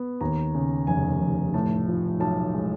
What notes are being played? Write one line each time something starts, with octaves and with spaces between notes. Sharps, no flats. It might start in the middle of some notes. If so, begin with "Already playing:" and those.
Already playing: B3
D#2 A#5
C#3
F1 G#5
F1
A2 A5
F3
B1 A5
G#3